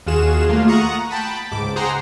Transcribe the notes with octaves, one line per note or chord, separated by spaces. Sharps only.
D#2 F4 F#4 G#4 E7
A3 A#3 F4
F#5 A#5 C#6 D#6
G5 A5 B5
C#2 G#2 D6
G#4 C5 F#5 G5 A#5 C6